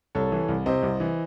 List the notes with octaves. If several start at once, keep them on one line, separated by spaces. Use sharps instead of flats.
C2 A4 C#5
E3
C2
C3 C5 D#5
C2
E3